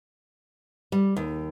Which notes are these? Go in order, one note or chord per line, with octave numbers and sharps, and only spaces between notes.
G3
D#2